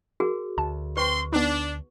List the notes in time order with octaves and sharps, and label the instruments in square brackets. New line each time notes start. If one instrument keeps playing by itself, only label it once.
[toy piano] F#4 G#4 A#4
[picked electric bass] D2 [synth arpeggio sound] A5
[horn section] C4 C6 [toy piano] B4 C#6
[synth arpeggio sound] B3 D#4 [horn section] D4